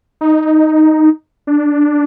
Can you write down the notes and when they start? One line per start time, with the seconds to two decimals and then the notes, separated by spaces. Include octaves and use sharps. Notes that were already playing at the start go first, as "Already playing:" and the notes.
0.21 D#4
1.47 D4